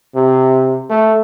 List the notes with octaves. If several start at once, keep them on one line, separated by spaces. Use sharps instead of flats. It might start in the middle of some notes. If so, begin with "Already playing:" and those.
C3
A3